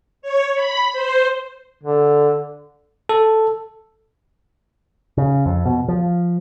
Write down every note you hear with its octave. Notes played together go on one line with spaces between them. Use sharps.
C#5
B5
C5
D3
A4
C#3
F2
B2
F3